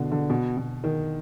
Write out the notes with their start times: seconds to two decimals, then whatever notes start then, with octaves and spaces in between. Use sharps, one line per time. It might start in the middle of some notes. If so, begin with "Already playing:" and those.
Already playing: B2 D3
0.12 D3
0.30 B2
0.57 B2
0.84 D#3